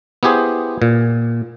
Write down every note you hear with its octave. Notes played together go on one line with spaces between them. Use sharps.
B3 E4 G4 G#4 C5
A#2